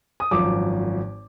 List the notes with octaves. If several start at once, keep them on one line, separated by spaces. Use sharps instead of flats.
D#6
G#1 F#2 F3 D6